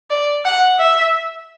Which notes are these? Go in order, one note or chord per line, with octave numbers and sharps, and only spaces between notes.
D5
F#5
E5